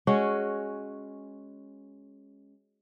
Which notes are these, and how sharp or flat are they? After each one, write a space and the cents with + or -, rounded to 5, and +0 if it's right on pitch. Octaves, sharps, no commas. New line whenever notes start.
G#3 +0 C#4 -5 F#4 +0